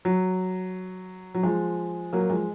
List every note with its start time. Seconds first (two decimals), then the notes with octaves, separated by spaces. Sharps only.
0.05 F#3
1.35 F#3
1.43 F3 G#3
2.13 F#3 A#3
2.30 F3 G#3